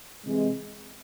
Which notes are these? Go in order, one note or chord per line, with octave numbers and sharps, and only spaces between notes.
C3 E3 G#3